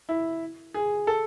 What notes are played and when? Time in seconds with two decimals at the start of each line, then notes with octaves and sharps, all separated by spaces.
0.09 E4
0.74 G#4
1.07 A4